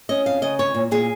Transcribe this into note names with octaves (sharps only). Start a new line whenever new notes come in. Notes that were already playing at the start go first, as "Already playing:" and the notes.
C#4 D#5
F2 F5
C#3 D#5
C#4 C#5
A#2
A#2 G#4